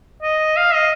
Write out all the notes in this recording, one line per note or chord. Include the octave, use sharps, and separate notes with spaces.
D#5
F5
D#5